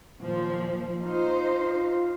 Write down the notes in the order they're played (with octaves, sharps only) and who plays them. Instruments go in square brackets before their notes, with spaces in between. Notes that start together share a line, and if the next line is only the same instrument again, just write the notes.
[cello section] D#2 A#2 F3
[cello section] D#4 C5 [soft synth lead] F4